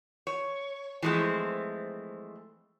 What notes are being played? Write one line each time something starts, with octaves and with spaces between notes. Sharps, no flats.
C#5
E3 F3 G#3 A3 C4